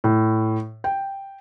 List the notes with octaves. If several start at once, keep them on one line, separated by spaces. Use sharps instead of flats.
A2
G5